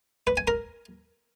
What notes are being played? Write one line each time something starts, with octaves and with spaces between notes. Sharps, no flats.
B4
G#5
A#4